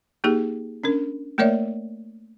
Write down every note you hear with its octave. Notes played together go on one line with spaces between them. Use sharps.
A#3 D#4 G4 G#4
C#4 D4 A#4
A3 A#3 A#4 C#5 D5 E5